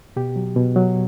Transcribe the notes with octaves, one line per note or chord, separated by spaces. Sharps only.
B2 G4
F#3
B2
F#3